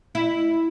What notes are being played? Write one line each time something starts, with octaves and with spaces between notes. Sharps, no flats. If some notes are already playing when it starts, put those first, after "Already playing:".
E4